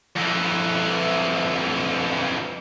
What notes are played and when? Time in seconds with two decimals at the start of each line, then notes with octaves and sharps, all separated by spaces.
0.16 F2 E3